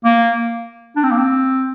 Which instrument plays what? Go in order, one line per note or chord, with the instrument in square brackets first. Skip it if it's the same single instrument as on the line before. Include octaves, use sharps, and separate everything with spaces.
[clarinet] A#3
D4
C4
A#3
C4